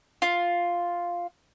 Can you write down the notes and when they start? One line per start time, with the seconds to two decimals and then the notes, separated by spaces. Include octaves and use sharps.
0.22 F4